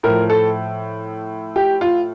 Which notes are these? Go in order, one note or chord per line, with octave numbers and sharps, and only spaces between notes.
A2 F3 A#4
A4
G4
F4